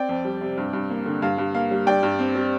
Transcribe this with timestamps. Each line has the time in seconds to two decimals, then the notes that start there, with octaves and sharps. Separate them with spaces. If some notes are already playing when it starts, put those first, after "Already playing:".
Already playing: C4 D5 G5
0.09 F2
0.25 G3
0.41 C3
0.57 G2
0.73 G2
0.90 A#3
1.06 D3
1.22 G2 F5
1.38 G2
1.54 A#3 F5
1.71 G3
1.87 G2 D5 G5
2.03 G2
2.19 C4
2.36 G3